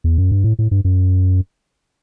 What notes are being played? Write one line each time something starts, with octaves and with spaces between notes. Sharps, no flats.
E2
F#2
G2
A2
A2
G2
F#2